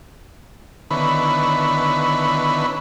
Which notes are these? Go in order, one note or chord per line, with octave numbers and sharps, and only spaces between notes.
D3 D#3 B3 C#4 E4 B4